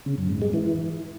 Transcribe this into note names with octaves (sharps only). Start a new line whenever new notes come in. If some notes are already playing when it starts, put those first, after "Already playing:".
C#3
F#2
G#2
G#3
E3